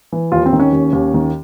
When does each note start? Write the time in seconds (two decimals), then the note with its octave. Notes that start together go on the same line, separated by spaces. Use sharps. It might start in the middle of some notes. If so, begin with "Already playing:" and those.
0.12 E3
0.32 D#2 F4
0.46 C4
0.53 D#3
0.60 C#4
0.73 D#2
0.93 D#2
1.14 D#3